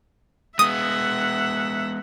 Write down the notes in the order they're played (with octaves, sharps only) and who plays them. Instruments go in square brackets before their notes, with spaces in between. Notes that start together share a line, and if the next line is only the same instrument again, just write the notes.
[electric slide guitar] G#3 B3 [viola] E5 F#5 [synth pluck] D#6